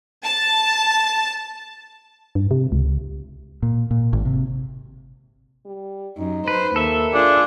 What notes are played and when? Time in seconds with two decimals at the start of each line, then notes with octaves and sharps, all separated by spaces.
0.24 A5
2.35 G2
2.51 C3
2.72 C#2
3.62 A#2
3.91 A#2
4.13 G#1
4.25 C3
5.65 G3
6.17 F#2 D#4
6.48 B4 C5
6.76 D#2 A4 A#4 E5
7.14 D4 F4 G#4